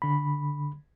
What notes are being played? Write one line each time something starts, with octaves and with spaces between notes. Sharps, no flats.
D3 B5